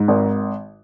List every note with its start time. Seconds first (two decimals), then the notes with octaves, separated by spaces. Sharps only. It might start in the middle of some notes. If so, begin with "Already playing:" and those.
Already playing: G#2
0.08 G#1